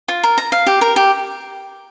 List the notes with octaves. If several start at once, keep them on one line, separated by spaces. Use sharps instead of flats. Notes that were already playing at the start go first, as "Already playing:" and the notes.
F4
A#4
A#5
F5
G4
A#4
G4